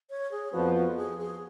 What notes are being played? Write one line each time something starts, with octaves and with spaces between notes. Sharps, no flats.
C#5
G#4
F2 F3 B3 F#4
F#4
G#4
G#4